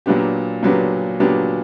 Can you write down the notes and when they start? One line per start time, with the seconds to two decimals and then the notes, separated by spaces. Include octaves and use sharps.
0.06 A#2 F#3 B3 D4 G4
0.63 A#2 F#3 B3 D4 G4
1.20 A#2 F#3 B3 D4 G4